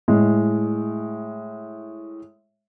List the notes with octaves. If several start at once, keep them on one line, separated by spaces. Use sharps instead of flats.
A2 G#3